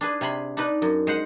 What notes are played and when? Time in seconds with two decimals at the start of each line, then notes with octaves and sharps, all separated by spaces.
0.01 D4 G#4 B4
0.21 C3 G#5 B5 C6
0.57 D4 D#4 B4
0.82 F#2
1.07 G#3 C5 F#5